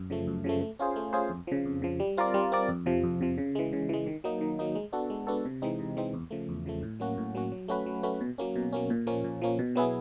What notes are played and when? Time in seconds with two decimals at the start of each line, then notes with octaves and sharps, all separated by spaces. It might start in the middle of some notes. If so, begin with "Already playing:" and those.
Already playing: F#2
0.10 C#3 F3 A3
0.27 F#2
0.44 C#3 F3 A3
0.61 A3
0.79 C#4 F4 G#4 C5
0.96 A3
1.13 C#4 F4 G#4 C5
1.30 F2
1.47 C#3 F3
1.65 F2
1.82 C#3 F3
2.00 G3
2.17 C4 F4 A#4 D5
2.34 G3
2.52 C4 F4 A#4 D5
2.69 F2
2.86 C3 F3
3.03 F2
3.21 C3 F3
3.38 C#3
3.55 E3 G#3
3.73 C#3
3.89 E3 G#3
4.06 D#3
4.24 F#3 A#3 D#4
4.41 D#3
4.59 F#3 A#3 D#4
4.75 G#3
4.93 B3 D4 F#4 A4
5.10 G#3
5.27 B3 D4 F#4 A4
5.45 C3
5.62 E3 G#3 C4 D#4
5.80 C3
5.97 E3 G#3 C4 D#4
6.14 E2
6.31 C#3 F3 A3
6.49 E2
6.66 C#3 F3 A3
6.83 A2
7.00 F#3 A#3 C#4 F#4
7.17 A2
7.35 F#3 A#3 C#4 F#4
7.52 F#3
7.68 A3 C#4 F#4 B4
7.86 F#3
8.03 A3 C#4 F#4 B4
8.21 B2
8.38 F#3 A#3 C#4
8.56 B2
8.72 F#3 A#3 C#4
8.90 A#2
9.07 F3 A#3 C#4
9.24 A#2
9.42 F3 A#3 C#4
9.59 B2
9.75 F#3 B3 E4 G#4